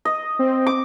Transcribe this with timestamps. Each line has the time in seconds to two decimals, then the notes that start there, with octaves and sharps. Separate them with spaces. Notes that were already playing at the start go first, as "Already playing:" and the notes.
0.05 D#5
0.39 C4
0.66 D6